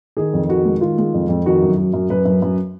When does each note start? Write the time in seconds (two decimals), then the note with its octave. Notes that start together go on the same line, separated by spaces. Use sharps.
0.17 D#3 G#4
0.33 F2
0.49 D#3 F#4
0.65 G#3
0.81 D#3 F4
0.98 G#3
1.14 F2
1.29 F2
1.45 D#3 F#4
1.62 F#2
1.77 F#3
1.93 F#2
2.10 F#2 B4
2.25 F#2
2.42 F#2